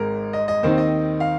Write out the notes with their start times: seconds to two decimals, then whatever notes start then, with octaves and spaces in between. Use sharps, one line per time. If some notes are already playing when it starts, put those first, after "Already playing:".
Already playing: G#1 G#2 G#3 A#4
0.33 D#5
0.48 D#5
0.63 D#2 D#3 C4 D#4 C5
0.78 D#5
1.20 F5